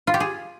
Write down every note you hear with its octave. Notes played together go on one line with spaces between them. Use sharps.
F4
G4
G#4